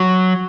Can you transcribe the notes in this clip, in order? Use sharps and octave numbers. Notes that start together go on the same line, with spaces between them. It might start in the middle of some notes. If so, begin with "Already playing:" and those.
Already playing: F#3